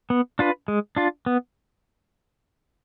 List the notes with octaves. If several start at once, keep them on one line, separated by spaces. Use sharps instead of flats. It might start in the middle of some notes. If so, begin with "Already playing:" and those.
B3
D4 F4 B4
G#3
D4 F4
B3